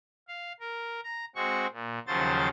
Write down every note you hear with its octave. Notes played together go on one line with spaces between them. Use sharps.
F5
A#4
A#5
G#3 C4 F#4 C#6
A#2
D#2 C#3 F3 F#3 C5 A6